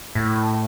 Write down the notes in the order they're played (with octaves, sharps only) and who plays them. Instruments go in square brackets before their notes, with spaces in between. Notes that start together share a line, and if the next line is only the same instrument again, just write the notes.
[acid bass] A2